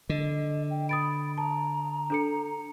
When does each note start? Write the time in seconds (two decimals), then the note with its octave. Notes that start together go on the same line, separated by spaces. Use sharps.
0.09 D3 D#5
0.70 G5
0.89 B5 D#6 A6 D7
1.38 A5 A#5
2.10 D4 A4 C#7